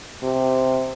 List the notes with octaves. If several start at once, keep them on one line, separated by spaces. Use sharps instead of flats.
C3